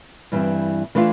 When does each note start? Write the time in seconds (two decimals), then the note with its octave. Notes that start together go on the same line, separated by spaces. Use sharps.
0.32 G2 E3 G3 C4
0.95 E3 A3 D4 F4